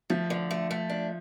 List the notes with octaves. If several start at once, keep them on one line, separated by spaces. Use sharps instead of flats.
F3 A3
D3
A3
A3
D4